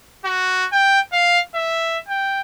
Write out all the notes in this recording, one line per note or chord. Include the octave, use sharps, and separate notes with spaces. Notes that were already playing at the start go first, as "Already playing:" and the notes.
F#4
G5
F5
E5
G5